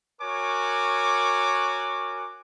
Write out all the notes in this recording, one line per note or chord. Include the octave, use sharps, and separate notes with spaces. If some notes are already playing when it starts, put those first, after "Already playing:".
F#4 A#4 C#5 G#5 D6